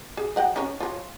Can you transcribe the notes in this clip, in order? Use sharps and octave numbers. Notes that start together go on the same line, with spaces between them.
G#4
F#3 F#5 G5
C#4 D#4 C#5
F4 C#5